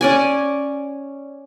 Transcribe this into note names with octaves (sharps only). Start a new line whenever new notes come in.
C#4 D5 G#5